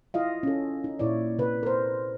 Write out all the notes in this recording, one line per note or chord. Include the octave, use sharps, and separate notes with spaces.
E4 F4 D#5 F5
C#4 A4
D#4
A#2 E4 C#5 D5
C3 B4
A#4 C5